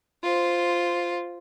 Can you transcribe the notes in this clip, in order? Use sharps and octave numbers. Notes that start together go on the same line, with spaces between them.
F4 C5